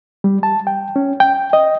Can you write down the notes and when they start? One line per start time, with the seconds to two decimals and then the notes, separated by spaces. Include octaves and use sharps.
0.24 G3
0.43 A5
0.67 G5
0.96 C#4
1.20 G5
1.53 D#5